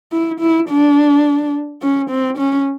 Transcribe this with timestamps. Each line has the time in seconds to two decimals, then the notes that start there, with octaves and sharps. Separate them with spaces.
0.12 E4
0.40 E4
0.69 D4
1.82 C#4
2.10 C4
2.38 C#4